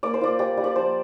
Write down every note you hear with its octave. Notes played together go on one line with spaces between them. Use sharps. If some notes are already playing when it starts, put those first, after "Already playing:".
A#3 D5
C5
F4 D5
G3 D5
G3
D5
F3 C5